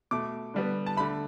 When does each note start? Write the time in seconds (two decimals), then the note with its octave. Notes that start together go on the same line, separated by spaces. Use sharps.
0.11 B2 A3 D6
0.54 D3 G3 B3
0.86 A5
0.97 A3 B5
1.00 D3